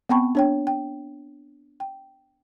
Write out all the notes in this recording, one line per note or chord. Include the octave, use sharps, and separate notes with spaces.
B3 C4 G5 A5 B5 C#6
D4 C#5 G5
G5
G5